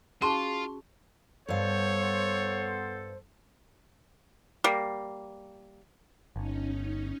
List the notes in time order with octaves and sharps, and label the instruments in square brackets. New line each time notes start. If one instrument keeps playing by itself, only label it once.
[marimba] C#4 F#4 [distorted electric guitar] F4 [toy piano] G#4 A5 [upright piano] C6
[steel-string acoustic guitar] G2 F5 [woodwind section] B3 A4 C5 [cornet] C#5
[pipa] G3 A#3
[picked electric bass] G1 [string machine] C#4 D#4